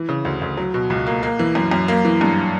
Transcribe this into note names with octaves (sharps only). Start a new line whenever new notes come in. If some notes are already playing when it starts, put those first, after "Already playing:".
Already playing: E3
C#3
D2
D2
F#3
B2
C#2
A#3
A#3
E3
F#2
F#2
A#3
E3
G2